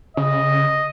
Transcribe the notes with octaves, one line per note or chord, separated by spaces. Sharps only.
C#3 D#5